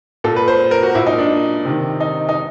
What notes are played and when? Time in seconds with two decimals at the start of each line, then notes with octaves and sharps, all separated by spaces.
0.24 A#2 A4
0.36 B4
0.48 C5
0.71 A#4
0.83 F#4
0.95 A#2 E4
1.06 D#4
1.18 D4
1.65 C3 D#3
2.00 D#4
2.29 D#4